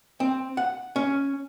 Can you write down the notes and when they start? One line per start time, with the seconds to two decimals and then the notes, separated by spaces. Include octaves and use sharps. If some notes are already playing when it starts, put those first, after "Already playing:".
0.20 C4
0.57 F#5
0.96 C#4